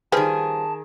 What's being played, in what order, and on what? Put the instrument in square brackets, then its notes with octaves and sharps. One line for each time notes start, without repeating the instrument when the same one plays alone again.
[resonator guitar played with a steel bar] D#3 G#4 [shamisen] F3 G3 B4 [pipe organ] A5